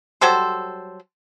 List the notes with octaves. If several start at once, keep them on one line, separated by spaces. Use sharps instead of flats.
F#3 G3 A4 C5